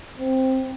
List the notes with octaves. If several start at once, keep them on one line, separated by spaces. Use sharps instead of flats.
C4